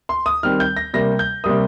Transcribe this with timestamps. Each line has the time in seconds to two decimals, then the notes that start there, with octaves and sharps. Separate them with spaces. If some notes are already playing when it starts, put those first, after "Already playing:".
0.09 C6
0.26 D#6
0.43 D#3 G3 C4 F6
0.60 G6
0.77 A#6
0.94 C3 G3 A#3 A#6
1.19 G6
1.44 C3 G3 A#3 D#6